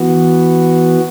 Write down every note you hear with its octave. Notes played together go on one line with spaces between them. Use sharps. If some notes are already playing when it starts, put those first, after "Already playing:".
Already playing: E3 B3 F#4